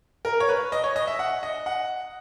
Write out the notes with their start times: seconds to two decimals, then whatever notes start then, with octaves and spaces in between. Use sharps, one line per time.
0.25 A#4
0.40 C#5
0.49 B4
0.72 D#5
0.84 C#5
0.96 D#5
1.07 E5
1.19 F#5
1.43 D#5
1.66 F#5